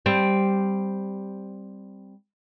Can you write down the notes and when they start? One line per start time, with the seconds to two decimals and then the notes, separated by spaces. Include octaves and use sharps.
0.06 G3 C4